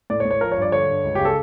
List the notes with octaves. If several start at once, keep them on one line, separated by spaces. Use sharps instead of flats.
A2 D5
C#5
A2
C#5
F3 A#4
C#5
G2 D5
D3 C#5
G2
C#2
C#3 G4
A4